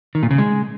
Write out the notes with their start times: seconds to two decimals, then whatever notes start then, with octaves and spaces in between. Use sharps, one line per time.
0.15 D#3
0.23 A#2
0.31 C#3
0.38 G#3